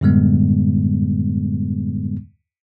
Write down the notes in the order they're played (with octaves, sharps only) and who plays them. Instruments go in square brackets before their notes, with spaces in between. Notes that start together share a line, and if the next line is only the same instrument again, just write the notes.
[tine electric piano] F#2 A2 D3 G3 G#3 B3